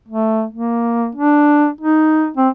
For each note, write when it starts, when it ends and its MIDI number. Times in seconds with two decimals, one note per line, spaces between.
0.08 0.45 57
0.54 1.09 58
1.15 1.69 62
1.81 2.30 63
2.37 2.49 60